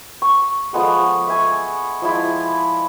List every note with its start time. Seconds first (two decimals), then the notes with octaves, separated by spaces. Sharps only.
0.22 C#6
0.73 F3 G#3 B3 A4
1.28 E5 G#5 C#6
2.02 F3 G#3 E4